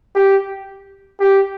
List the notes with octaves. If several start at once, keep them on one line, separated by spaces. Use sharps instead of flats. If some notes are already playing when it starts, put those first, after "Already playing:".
G4
G4